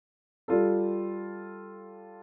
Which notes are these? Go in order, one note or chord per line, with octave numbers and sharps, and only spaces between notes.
G3 F4 A4